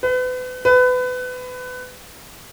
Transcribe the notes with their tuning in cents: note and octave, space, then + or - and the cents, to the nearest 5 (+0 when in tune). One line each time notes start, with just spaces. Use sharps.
B4 +35
B4 +25